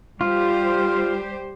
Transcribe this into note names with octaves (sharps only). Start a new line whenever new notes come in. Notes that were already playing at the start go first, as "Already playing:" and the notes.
G3 F4 G4 C5